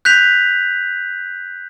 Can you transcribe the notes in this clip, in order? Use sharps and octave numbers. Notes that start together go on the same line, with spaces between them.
F#6 G6 B6 F7